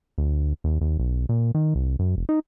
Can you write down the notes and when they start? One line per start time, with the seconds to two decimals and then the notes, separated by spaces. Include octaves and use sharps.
0.18 D2
0.64 D#2
0.81 D#2
0.99 B1
1.29 A#2
1.55 D#3
1.75 C2
1.99 F#2
2.17 F1
2.29 D#4